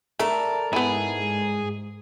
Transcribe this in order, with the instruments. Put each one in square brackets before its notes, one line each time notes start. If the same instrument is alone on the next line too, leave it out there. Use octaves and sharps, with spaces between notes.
[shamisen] A3 [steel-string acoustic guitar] A4 A#4 D5
[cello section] G#2 [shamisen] B3 E4 [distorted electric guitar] G#4